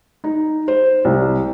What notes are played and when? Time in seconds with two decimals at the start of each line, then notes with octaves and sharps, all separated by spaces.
0.24 D#4
0.68 C5
1.05 C2